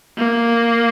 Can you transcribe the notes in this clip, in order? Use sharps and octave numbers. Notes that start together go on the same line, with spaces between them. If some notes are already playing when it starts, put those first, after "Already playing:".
A#3